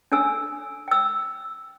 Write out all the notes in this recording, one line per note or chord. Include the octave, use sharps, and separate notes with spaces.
D4 A4 G#5 E6
G5 E6